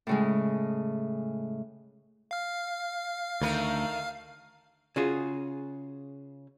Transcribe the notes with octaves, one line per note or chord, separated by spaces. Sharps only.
A2 C#3 G#3
F5 F6
D2 D#3 A3 A#4
C#3 F4 F#4 G#4